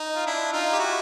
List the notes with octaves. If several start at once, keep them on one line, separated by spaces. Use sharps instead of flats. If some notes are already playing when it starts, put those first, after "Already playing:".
Already playing: D#4
F4
D4 E4
D#4 F4
G4
E4 F#4